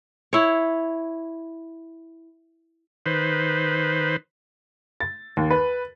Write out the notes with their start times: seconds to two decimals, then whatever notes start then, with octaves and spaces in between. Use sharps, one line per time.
0.33 E4 C#5
3.06 D#3 B4 C5
5.00 A6
5.37 D#2
5.51 B4